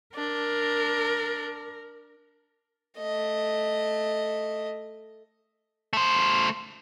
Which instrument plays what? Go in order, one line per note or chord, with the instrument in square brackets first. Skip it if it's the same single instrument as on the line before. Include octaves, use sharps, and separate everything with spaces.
[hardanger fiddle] D4 [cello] A#4
[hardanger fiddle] A3 D#5
[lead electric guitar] A3 C5